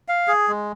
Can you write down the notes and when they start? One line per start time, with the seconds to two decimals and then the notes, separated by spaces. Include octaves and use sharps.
0.08 F5
0.28 G#4
0.48 G#3